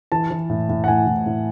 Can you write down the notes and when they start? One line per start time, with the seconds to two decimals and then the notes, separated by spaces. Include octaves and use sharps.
0.12 E3 A5
0.31 E3
0.50 A2
0.69 A2
0.84 F#5
0.88 A2 G#5
1.07 A2
1.26 A2